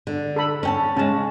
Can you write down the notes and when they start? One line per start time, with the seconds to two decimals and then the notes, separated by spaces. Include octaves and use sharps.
0.07 D3
0.36 A4 B5
0.63 C#4 G5 A5
0.96 C#3 G#3 C#4 A5